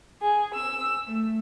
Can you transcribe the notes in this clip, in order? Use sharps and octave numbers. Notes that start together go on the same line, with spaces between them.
G#4
E6
A3